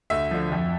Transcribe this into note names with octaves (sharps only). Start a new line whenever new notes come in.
D2 E5
D3 F3
F2